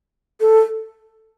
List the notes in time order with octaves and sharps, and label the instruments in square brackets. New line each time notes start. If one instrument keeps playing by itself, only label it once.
[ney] A4